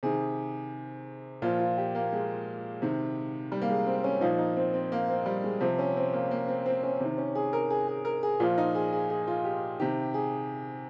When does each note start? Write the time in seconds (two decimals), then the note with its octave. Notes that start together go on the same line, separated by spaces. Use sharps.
0.03 C3 D#3 G#4
1.42 A#2 F3 F4
1.60 F4
1.78 G4
1.95 A#3
2.13 G#3
2.82 C3 D#3
3.52 G3
3.62 A#3
3.69 G#3
3.87 C4
4.04 C#4
4.21 A#2 F3 D#4
4.38 D#4
4.56 C4
4.74 C4
4.92 A#3
5.09 C4
5.26 G3
5.44 G#3
5.61 C3 F3 C4
5.79 C#4
5.97 C4
6.13 A#3
6.31 A#3
6.48 C4
6.66 C4
6.83 C#4
7.00 C3 D#3
7.18 C#4
7.35 G#4
7.53 A#4
7.71 G#4
7.88 G#4
8.05 A#4
8.23 G#4
8.40 A#2 F3 F4
8.58 D#4
8.75 G#4
8.93 G#4
9.10 G#4
9.28 F4
9.44 G4
9.80 C3 D#3 G4
10.14 G#4